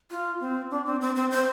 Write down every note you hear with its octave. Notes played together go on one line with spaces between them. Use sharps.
F4
C4
D4
C4
C4
C4
C5